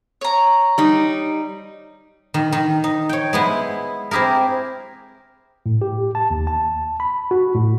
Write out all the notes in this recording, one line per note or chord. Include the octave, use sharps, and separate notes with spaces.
C#5 A#5
G3 D#4
D#3
D#3
D#4
C#5 G5
G#3 B3 E4
C4 E4 G4 G#4 A#4
A2
G4
A5
D#2
A5
B5
F#4
A2